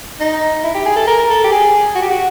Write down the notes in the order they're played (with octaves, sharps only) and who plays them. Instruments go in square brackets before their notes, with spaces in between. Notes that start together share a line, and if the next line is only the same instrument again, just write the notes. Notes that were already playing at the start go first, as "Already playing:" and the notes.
[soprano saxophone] D#4
E4
G4
G#4
A4
A#4
A4
G4
G#4
F#4
G4
F#4